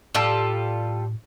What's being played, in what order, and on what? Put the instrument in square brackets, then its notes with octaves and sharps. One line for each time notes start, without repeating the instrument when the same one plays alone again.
[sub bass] A2 [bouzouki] G3 F4 A4